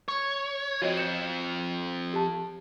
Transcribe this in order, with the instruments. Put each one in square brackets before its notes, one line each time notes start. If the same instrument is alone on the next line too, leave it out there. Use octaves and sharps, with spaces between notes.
[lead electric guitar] C#5 [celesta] C#6
[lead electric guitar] F3 C4 [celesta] F#4 C#5 D#5
[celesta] G6 C#7 E7
G4 A5